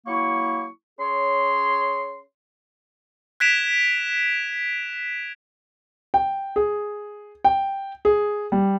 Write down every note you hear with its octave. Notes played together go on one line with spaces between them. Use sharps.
F#3 A#3 E4 C#6
C#4 G#4 C#5 C6
F#6 G#6 B6 D7 E7 F7
G5
G#4
G5
G#4
G3